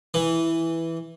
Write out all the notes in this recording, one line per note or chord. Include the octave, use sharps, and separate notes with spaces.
E3